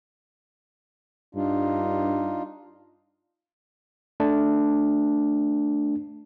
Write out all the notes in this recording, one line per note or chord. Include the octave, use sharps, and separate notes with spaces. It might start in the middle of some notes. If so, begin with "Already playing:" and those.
G2 D4 D#4 F4
A3 D4